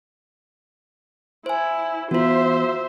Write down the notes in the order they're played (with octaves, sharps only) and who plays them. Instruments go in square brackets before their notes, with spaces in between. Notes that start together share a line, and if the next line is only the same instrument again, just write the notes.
[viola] E4 [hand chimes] C5 G#5
[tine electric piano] E3 B3 [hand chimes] F4 F#4 [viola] C5 E5